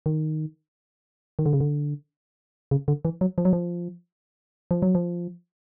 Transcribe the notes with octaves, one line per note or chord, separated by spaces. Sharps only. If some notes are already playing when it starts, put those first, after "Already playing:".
D#3
D#3
D3
C#3
D3
C#3
D3
E3
F#3
F3
F#3
F3
F3
F#3
F3